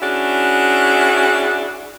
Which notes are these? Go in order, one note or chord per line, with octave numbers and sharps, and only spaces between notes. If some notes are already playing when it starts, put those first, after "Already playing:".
C#4 D4 E4 F#4 G#4